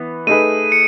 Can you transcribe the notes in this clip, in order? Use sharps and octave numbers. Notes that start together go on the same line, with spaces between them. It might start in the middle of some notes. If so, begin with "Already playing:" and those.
Already playing: E3 B3
A3 D#4 G#4 B4 D#7
C#7